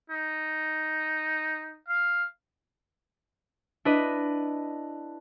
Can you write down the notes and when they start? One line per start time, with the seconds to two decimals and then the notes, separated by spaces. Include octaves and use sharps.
0.10 D#4
1.88 F5
3.85 D4 E4 B4 D#5